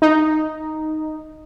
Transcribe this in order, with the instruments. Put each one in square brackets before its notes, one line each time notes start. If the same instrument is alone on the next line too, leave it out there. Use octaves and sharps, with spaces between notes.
[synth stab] D#4